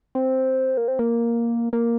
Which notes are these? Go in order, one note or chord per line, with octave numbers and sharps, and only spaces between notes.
C4
A#3
C4
A#3
A#3